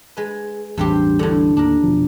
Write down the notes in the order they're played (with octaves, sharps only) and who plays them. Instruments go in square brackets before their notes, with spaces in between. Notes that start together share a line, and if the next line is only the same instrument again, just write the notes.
[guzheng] G#3 B4
[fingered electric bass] A1 E2 G3 [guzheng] G2 C4 G4
[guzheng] A2 D3
[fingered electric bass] D#2 [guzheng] D4 A#4
[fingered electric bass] F1 B2 F3